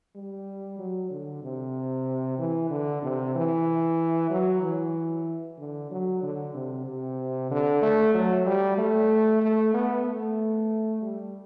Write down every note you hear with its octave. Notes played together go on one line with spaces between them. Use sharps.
G3
F#3
D3
C3
E3
D3
C3
E3
F#3
E3
D3
F#3
D3
C3
C3
D3
A3
F#3
G3
A3
A3
B3
A3
G3